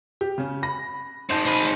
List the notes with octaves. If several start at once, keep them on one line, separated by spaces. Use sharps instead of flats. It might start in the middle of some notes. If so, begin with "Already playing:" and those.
G4
C#3 C#4
B5 A#6
C4 D#4 A5 G6 E7
C5 B5